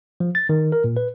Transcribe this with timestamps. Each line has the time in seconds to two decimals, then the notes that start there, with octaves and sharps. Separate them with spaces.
0.20 F3
0.35 A6
0.49 D#3
0.72 A#4
0.84 A#2
0.97 B4